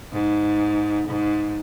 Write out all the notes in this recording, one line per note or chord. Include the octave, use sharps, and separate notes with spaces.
G#2
G#2